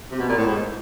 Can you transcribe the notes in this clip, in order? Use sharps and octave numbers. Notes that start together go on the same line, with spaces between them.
C3
B2
A#2
A2
G#2